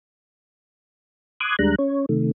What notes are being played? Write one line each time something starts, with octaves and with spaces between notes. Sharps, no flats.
C6 D6 D#6 F#6 G#6
D#2 G3 G#3 D4 A#5 F#6
C#4 C#5
C3 D#3 A3